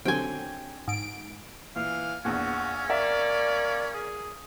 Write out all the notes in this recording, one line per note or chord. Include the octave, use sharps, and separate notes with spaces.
D3 F#3 C4 G5 G#5
G#2 D7
A#2 E3 F5
A#1 E2 A#2 C#4 F#5
A#3 D5 E5
G#4